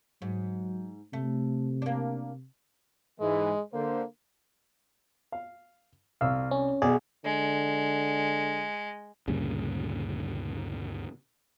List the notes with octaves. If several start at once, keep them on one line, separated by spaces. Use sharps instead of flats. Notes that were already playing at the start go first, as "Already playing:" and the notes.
G#2 F#3
C3 A3
A#3 D4
G#2 E3 G#3
D3 A#3 C5
F5
C2 F5 E6
C#4
B1 G#4 D5
D3 G#3
D2 G2 A#2 C#3